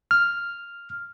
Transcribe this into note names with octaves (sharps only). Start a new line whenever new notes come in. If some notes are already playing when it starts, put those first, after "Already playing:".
F6